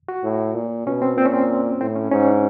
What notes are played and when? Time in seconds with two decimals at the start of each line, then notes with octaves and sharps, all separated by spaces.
0.08 F#4
0.24 A2
0.55 A#2
0.87 B2 C#4
1.02 C4
1.17 A#2 C4
1.26 C#4
1.34 C4
1.81 A2 C4
1.96 C#4
2.12 G#2 C#4
2.27 D4